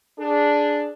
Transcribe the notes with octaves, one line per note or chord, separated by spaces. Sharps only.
D4 G#4